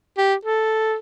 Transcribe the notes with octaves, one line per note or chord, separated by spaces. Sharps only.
G4
A4